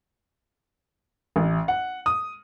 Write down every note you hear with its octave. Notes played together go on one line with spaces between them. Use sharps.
A1
F#5
D#6